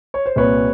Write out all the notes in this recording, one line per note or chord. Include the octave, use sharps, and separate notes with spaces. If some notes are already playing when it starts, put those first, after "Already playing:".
C#5
C5
C2 A#2 B4 C#5